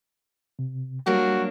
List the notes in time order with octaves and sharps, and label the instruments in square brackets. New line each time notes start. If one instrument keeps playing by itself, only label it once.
[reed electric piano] C3
[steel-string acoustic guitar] F#3 A#3 D4 [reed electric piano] G3 [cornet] F#4